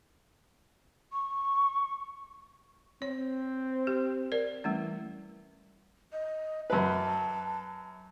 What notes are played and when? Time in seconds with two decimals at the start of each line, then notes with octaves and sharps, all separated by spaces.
1.12 C#6
3.02 C4 C#5
3.87 G4
4.32 A#4 D5
4.64 E3 G3 A3 C#4
6.13 D#5
6.70 F#2 B4 A5